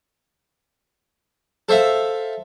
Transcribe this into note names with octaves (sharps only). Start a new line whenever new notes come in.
A4 C5 E5 F5